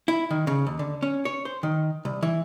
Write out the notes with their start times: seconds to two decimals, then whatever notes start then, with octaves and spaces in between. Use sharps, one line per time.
0.08 E4
0.31 D#3
0.47 C#3
0.67 D#2
0.79 D3
1.03 C#4
1.25 C#5
1.45 C5
1.63 D#3
2.05 C2
2.23 E3